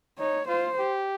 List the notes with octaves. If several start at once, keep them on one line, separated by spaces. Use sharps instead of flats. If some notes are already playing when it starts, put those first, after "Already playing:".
D#4 C#5
F4 C5
G4